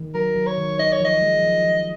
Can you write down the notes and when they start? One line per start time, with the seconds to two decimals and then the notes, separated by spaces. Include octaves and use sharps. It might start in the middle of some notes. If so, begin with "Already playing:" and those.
Already playing: D#3
0.14 F#3 A#4
0.36 F#3
0.46 C#5
0.58 D#3
0.79 D#4 D#5
0.92 C#5
1.00 F3 D#5
1.21 G#3
1.43 F3
1.64 F3